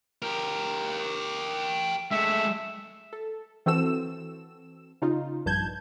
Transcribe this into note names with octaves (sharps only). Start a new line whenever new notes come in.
G4 A#4
G#3 A3 E5
A4
E3 C4 F#4 A4 E6 E7
C#3 D#4 F4
A#1 G2 A5 G6 G#6